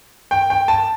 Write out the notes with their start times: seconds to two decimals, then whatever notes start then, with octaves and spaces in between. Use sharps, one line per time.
0.31 G5
0.50 G5
0.68 A5